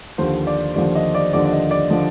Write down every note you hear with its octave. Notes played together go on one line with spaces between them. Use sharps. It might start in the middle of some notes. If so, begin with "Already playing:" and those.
D#2 D3 F3 C5
D5
D#2 D3 F3 D5
D#5
D5
D#2 D3 F3 D5
D5
D#5
D5
D3 F3